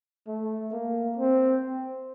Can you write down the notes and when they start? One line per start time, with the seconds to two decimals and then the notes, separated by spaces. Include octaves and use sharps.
0.28 A3
0.72 A#3
1.17 C4